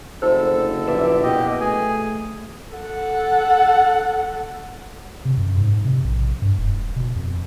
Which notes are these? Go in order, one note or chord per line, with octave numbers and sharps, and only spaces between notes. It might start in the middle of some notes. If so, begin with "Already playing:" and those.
F#1 A4 C5
D2
A#1 B4 D5 E5
B2 G4 D#5
A3 G#4 G#5
A4 F#5
C3
F#2
G#2
C3
A#1
G2
E1
B2
F2